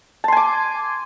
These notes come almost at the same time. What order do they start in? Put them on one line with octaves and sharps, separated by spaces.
A5 C6 G#5 D6